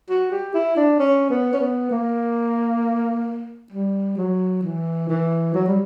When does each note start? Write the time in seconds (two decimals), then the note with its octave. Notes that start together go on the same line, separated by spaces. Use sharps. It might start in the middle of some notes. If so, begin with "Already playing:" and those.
0.09 F#4
0.31 G4
0.54 E4
0.76 D4
0.99 C#4
1.30 B3
1.53 C#4
1.60 B3
1.91 A#3
3.72 G3
4.17 F#3
4.63 E3
5.09 E3
5.54 F#3
5.67 G3